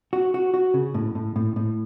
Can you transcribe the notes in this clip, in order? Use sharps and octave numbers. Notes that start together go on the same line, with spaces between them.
F#4
F#4
F#4
C#3
A2
A2
A2
A2